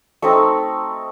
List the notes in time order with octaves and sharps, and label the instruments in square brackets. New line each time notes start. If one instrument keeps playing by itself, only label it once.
[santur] A3 C4 D#4 C#6